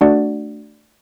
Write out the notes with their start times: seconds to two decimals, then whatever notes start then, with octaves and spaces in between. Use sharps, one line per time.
0.01 A3 D4 F#4 D5 F#5